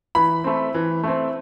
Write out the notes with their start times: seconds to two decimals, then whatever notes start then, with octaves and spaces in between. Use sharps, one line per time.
0.15 E3 B5
0.44 A3 C4
0.74 E3
1.03 A3 C4